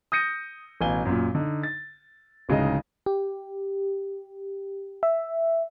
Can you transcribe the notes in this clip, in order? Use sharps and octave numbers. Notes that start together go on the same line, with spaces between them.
D#6 G6 A#6 C#7 D#7
A1 B2 F5 G#5 G7
F#2 A#2
D3 D#4
A6
D1 C#3 G#3 D#4 D#5
G4
E5